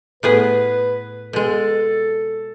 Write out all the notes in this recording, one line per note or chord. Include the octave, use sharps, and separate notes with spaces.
A2 B3 G#4 B4
B2 G#3 A4